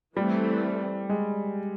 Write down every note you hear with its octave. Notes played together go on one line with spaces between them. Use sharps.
E3 G3 A3 C4
G#3